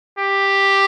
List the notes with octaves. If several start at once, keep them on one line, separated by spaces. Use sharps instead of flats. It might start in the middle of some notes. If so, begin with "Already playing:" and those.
G4